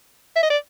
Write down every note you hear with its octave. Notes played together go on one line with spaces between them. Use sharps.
E5
D#5
D5